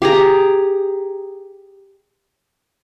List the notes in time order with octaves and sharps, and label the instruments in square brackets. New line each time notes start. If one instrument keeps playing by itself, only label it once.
[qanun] G4 G#4 A#5